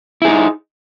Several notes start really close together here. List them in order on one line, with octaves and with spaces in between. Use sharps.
E4 G#4 D#4